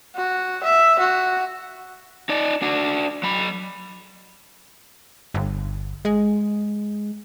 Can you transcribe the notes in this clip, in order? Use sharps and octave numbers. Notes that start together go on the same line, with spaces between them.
F#4
E5
F#4
D#4 D5
D4 F#4
F#3 B5
G1
G#3